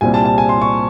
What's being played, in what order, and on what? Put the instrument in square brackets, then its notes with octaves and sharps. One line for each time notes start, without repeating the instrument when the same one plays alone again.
[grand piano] C2 A#2 G3 C4 G#5
A5
A5
G#5
C6
C#6